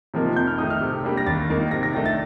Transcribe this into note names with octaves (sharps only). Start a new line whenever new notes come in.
C3 F3 A#3 D#4
F2 G6
F6
D#3 A3 D#4 D#6
F6
C3
G3 A#3 D4
A#6
D#2 A6
D#3 A#3 D#4
C3 A#6
A#6
D#3 A3 D4 A#6
A6